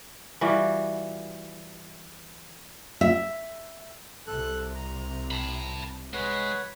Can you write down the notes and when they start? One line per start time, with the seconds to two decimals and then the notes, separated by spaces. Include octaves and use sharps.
0.41 E3 G3 F4 F#4
3.01 E5
4.27 C2 C3 A4 F#6
4.75 A#5
5.31 A5 B5
6.14 G#3 B4 C#5 F#5